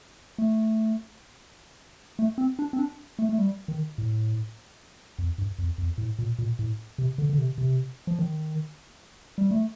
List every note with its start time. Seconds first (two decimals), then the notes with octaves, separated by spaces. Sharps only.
0.38 A3
2.19 A3
2.38 C4
2.59 D4
2.73 C4
2.79 D4
3.19 A3
3.29 A3
3.38 G3
3.68 D#3
3.98 A2
5.19 F2
5.38 G2
5.59 F2
5.78 F2
5.98 A2
6.19 A#2
6.39 A#2
6.59 A2
6.98 C3
7.18 D3
7.29 D3
7.38 C3
7.58 C3
8.07 F3
8.19 D#3
9.38 G3
9.51 A3